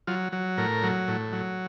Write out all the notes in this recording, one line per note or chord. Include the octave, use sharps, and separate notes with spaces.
F#3 F4
F#3
A2 A#4
F#3
A2
F#3